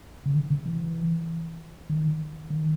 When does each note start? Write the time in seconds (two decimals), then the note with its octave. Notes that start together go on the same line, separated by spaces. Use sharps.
0.26 C#3
0.35 D#3
0.50 C#3
0.66 E3
1.90 D#3
2.50 D#3